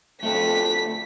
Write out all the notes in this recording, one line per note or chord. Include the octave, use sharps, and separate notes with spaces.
F2 A3 D4 B6